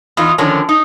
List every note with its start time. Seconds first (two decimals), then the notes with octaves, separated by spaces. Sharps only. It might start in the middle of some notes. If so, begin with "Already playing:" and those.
0.17 E2 D#4 F4
0.38 D3 D#3 F3 C#4 D4 A#4
0.69 D#4